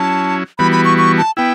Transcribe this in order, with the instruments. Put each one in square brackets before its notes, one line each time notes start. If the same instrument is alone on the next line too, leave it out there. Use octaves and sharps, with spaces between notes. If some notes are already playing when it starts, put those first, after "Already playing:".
Already playing: [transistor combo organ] F#3 C#4 E4 [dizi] A5
[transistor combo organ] E3 G3 B3 F#4 [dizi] B5
[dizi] B5
C#6
C#6
A5
[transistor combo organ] B3 E4 [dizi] G5